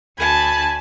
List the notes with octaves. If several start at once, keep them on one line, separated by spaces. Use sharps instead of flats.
D2 G#5 A5 B5